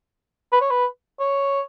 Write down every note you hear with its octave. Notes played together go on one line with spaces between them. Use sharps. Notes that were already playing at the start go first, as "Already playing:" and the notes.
B4
C#5
B4
C#5